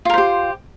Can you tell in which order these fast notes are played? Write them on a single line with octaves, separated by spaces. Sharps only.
F4 A#4 C5 G4